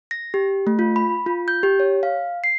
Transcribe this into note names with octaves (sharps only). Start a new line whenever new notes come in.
A#6
G4
A3
F4
B5
F4
G6
G4
C#5
F5
C7